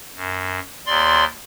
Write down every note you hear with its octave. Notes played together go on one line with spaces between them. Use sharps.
F#2
D#2 D5 C6